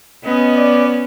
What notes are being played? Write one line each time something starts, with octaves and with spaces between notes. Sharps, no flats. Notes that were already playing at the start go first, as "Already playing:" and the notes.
B3 C#4 D#5
D5